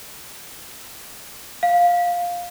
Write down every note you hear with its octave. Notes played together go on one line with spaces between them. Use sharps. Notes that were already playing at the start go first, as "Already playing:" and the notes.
F5